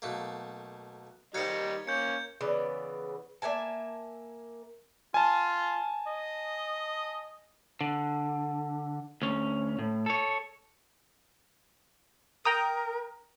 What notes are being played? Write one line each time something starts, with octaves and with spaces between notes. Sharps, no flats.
B1 A3 A#3
D#3 G3 C5 D#5 F5 G#6 C#7
A#3 C#4 G6 C#7
C#3 E3 B3 D5
A#3 E5 G#5 A5
F4 G#5 A5
D#5
D3
D2 C#4
A2
A4 C#5
A#4 G5 A#5 D#6